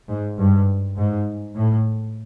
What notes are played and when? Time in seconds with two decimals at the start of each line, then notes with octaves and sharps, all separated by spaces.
0.09 G#2
0.38 G2
0.97 G#2
1.55 A2